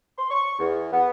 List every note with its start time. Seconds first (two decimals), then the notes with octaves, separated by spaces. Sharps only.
0.17 C6
0.30 C#6
0.59 E2
0.93 B3